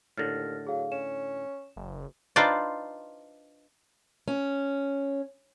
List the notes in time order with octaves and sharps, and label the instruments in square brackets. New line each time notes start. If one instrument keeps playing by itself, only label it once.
[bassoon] D#2 [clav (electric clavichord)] A2 D3 [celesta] F6 A6 A#6
[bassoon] F#3 [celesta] G#4 F5
[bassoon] C#4 [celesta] E7
[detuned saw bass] F#1
[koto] D4 D#4 F4 B4 C5 D5
[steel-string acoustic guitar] C#4